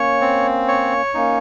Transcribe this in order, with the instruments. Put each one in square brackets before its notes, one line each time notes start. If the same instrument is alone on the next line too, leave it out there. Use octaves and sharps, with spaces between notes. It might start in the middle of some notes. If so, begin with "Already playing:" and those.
Already playing: [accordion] A#3 C#4 [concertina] C#5
[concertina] C4
C#5
[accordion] A#3 C#4 [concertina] D#4